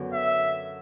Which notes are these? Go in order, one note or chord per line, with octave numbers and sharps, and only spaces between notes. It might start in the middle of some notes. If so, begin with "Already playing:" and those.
Already playing: F#2 D3 F#3 B3
E5